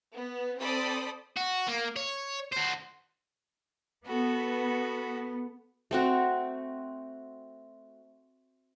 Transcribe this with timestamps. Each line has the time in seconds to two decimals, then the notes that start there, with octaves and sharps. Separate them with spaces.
0.14 B3
0.60 C4 A4 C5 D5 B5 D#6
1.37 F#4
1.68 A#3
1.96 C#5
2.52 F#4 C5
4.06 B3 F#4 A4
5.91 A3 C4 F#4